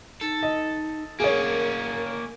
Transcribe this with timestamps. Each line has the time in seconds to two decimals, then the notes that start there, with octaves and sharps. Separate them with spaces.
0.21 D#4 A4
0.43 D#5
1.20 A#3 C#4 G#4 A#4 C#5